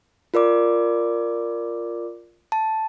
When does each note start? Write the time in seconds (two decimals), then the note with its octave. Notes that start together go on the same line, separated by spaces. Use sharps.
0.34 F4 A#4 D5 D6
2.52 A5